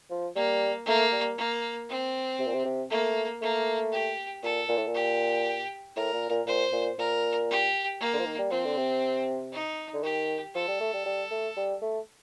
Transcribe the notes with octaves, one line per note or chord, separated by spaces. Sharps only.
F3
G3 A#3
A3 A#3
G3
A#3
C4
C3
A#2
C3
C3
A3 A#3
A3 A#3
G4
A#2 A4
A#2
A2
A#2
G4
A2 A#4
A#2
A#2
A#2 C5
A#2
A#2 A#4
G4
A#3
D3
F3
D#3
G3
F3 C4
D3
C3
D#4
D3
D#3 G4
F3 A4
G3
A3
G3
G3
A3
G3
A3